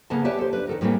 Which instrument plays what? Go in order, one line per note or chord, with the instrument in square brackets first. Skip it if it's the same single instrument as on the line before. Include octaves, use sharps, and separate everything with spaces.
[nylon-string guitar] C#3 A#3 B3 A4 A5
G4 B4 C#5 D5 E5 A5
A4 C5
D4 B4
D#3 A4 A#4
A2 G3 A3 A#3 C4 G#4